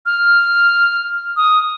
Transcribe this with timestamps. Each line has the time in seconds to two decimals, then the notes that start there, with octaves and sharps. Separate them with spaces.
0.06 F6
1.37 D#6